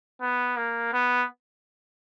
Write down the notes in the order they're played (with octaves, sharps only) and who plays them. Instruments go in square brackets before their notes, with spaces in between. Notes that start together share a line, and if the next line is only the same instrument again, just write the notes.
[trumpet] B3
A#3
B3